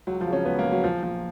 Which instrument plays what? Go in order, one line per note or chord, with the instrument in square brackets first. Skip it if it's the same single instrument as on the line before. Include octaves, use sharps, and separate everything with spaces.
[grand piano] C#2 F#3
F3
C#3
C#4
C#2 B3
A#3
C#3
F#3
A#1 F3
A#2 F3